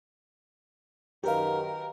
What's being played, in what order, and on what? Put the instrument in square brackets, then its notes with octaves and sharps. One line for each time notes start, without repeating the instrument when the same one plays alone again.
[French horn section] F#2 D#3 [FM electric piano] G4 B4 F5 [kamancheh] A#4